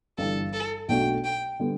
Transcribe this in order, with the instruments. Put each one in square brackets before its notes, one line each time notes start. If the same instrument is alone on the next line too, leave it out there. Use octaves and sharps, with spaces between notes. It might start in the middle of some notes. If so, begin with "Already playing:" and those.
[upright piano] G1 G2 E3 G3 [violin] A4
[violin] A4
[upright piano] B1 B2 A3 D4 F#4 [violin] G5
[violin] G5
[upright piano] D3 G3 B3